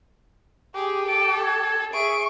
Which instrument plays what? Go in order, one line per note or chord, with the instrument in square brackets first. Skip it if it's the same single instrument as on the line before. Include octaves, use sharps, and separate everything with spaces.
[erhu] G4 [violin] G#4
[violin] A4 [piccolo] D7
[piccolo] G#6
[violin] G#4 D7 [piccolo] E5 [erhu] C#6